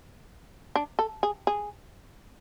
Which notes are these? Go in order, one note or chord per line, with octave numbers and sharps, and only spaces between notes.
D4
A4
G#4
G#4